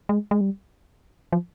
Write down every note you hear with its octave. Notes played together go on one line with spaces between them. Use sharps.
G#3
G#3
G3
F3